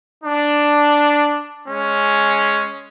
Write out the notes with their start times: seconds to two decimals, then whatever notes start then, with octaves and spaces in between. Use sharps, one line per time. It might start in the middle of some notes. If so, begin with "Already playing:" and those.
0.23 D4
1.68 G#3 C#4